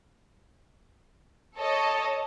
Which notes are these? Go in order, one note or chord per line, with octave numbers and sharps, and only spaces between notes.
A4 C#5 D#5 A5